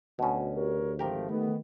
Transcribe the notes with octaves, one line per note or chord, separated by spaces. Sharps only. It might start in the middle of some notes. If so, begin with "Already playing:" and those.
D2 B2 C#4
G4 A#4 C#5
G#1 F3 A3 G4 A#4 G5
D#3 A3 B3